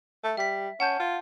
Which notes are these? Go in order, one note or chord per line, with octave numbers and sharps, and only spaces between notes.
A3
G3 E5 B6
C#4 F#5 A5 G6
F4